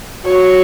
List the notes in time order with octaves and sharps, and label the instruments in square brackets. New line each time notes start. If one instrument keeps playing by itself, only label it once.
[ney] F#4 [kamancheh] C#5